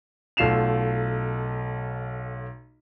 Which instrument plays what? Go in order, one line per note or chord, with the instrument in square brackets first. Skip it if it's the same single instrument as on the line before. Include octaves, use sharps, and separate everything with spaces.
[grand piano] B1 A3 F4 C7 E7 F7